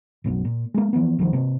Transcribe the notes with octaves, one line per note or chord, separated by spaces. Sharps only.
F#1 B1 F#2
A#2
G#3 A#3
E3 F3 A#3 B3
B1 D#3 F3 G3
C3 A#3